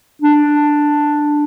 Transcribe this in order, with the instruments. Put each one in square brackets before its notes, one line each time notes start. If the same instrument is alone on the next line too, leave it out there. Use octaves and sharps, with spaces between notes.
[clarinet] D4